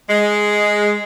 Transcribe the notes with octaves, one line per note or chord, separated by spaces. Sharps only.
G#3